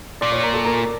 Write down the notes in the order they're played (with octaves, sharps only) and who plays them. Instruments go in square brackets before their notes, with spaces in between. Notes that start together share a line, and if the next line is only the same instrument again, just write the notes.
[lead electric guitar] A#2 [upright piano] D5 D6
[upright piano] C#5 C#6
A#4 A#5
A4 A5
A#4 A#5